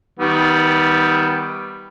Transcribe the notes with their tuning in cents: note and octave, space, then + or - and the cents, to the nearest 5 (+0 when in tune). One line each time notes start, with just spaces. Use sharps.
D#3 +25 G3 +0 B3 +0